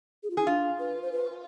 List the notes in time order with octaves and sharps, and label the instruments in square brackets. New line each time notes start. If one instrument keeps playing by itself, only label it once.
[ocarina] G#4
F4
[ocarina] E4 [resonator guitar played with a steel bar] G#4
[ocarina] D4 [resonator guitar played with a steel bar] F4
[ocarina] B4
C5
B4